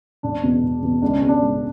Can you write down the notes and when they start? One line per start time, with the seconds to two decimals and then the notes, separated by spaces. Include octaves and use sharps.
0.23 E1 D4
0.43 E2 B2
0.62 E1
0.82 E2 B2
1.02 C#2 D4
1.16 C#4
1.22 B2
1.28 D4
1.42 C#2